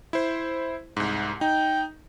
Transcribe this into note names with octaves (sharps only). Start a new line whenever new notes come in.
E4 C5
C2 G#2
D#4 G5